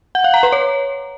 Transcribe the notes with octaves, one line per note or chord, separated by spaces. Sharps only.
F#5
F5
A#5
B4
C#5